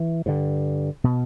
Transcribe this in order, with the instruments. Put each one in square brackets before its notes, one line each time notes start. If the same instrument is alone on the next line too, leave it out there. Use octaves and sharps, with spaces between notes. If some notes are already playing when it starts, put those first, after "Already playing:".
Already playing: [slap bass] E3
G2 D3
B2